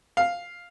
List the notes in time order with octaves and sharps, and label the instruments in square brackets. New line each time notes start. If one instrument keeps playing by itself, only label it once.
[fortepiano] F5